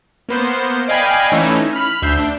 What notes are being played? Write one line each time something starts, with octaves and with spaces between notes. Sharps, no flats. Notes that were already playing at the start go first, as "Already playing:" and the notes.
A#3 B3 C5
D5 D#5 F5 G5 G#5 B5
E3 A3 C#4 D#4 E4
B5 F6
D2 E5 G6 C7
D4